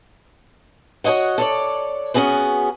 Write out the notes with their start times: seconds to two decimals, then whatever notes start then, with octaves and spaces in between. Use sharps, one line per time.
1.04 F#4 A#4 C#5 D#5 F#5
1.38 A4 C#5 D5
2.14 B3 C#4 F#4 G#4 B4